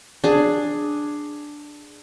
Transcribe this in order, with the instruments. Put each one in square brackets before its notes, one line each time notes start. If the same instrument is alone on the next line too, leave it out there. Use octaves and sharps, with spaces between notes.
[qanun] D4 G#4